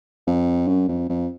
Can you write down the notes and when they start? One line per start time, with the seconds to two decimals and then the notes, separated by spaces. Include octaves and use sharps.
0.27 F2
0.67 F#2
0.88 F2
1.09 F2